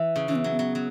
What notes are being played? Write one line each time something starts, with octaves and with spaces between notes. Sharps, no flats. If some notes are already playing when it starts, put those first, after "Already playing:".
Already playing: E3
C#3
E3 C#4
B3
F#3
B3
F#3
F#3